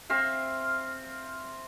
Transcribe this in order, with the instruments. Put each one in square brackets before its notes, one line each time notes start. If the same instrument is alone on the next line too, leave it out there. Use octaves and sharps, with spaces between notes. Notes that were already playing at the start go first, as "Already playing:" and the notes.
[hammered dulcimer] C4 E5 F5